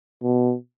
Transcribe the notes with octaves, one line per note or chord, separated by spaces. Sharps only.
B2